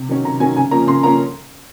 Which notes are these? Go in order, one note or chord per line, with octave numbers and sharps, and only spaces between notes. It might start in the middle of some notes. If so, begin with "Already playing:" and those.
Already playing: C3
D#3 F#3 C#4
C3 A#5
D#3 F#3 C#4 G#5
C#3 G#5
F3 A#3 C#4 A#5
C#3 C6
F3 A#3 C#4 A#5